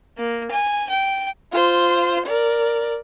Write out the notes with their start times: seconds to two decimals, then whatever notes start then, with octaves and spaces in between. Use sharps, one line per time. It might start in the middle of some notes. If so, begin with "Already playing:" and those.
0.17 A#3
0.51 G#5
0.89 G5
1.52 F4 C5
2.26 A#4 D5